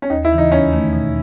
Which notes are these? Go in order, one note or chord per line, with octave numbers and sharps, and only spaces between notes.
C#4
D#2 D#4
E4
C#3 E3
D#4
E2 C#4
D#3 A3 D#4
B2